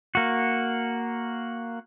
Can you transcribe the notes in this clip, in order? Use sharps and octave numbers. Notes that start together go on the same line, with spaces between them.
A#3 F#4